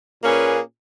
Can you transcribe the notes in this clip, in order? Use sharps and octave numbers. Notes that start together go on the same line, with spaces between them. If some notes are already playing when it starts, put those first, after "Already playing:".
A#2 A#3 C#4 G#4 B4